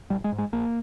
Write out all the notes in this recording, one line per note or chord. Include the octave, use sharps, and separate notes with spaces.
A#1 G3
G#3
G#2
G#3
A#1 A#3